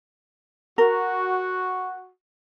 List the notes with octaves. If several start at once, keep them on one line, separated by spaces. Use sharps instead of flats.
F#4 A#4